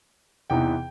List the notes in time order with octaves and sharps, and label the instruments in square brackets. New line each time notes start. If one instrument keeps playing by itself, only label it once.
[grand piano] E2 C3 E3 B3 D#4 G5